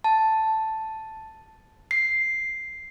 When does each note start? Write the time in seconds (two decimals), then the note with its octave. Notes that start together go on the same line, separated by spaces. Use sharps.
0.04 A5
1.91 C7